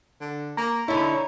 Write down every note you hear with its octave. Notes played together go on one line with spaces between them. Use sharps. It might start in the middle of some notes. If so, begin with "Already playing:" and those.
D3
A#3 A#5
D3 D#4 E4 C#5